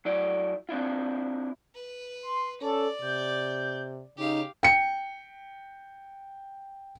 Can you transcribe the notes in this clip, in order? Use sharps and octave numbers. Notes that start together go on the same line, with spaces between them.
F#3 E4 D5
C4 D4 E4 F4
B4
C6
C#4 A4 D5
C3 G6
C#3 D#4 G4 F5
G5 C#7